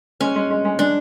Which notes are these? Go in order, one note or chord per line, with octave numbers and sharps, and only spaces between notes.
G#3 C#4
G#3
G#3
G#3
G#3 D4